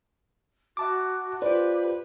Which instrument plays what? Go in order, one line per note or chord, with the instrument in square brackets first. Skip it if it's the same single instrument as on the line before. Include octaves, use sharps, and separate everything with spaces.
[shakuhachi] F#4 [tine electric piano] E5 A5 D6
[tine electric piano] F4 C5 [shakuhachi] G4 [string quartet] B4 [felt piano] D5